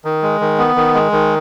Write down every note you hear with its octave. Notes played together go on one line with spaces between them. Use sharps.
D#3
G#3
D#3
B3
D#3
G#3
D#3